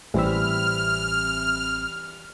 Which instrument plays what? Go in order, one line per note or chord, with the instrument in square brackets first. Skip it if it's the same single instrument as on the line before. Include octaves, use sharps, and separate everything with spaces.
[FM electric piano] A1 C4 E5 [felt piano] E3 G3 [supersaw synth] F6